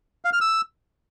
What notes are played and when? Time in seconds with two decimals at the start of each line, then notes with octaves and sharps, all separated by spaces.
0.25 F5
0.33 F6
0.41 E6